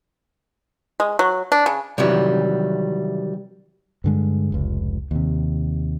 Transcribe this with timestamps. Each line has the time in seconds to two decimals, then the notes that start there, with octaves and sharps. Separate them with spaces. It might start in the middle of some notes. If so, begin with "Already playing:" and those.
1.00 G#3
1.19 F#3
1.52 D4
1.66 C#3
1.98 C3 D#3 E3 F#3 G3
4.04 G2 D3 G#3
4.52 F1 C#2
5.11 D#2 C3